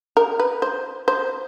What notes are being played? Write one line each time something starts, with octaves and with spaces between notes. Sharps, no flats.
A#4
B4
C5
C5